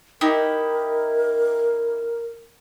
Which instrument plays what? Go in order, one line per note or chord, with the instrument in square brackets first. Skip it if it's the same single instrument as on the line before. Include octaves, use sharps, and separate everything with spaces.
[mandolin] D#4 E4 G4 [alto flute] A#4